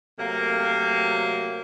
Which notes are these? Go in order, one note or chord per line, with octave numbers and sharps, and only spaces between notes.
C3 F#3 A3 A#3